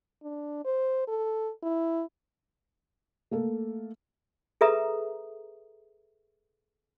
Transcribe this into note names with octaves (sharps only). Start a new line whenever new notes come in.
D4
C5
A4
E4
A3 A#3 A4
G#4 A4 B4 E5 A#5 D#6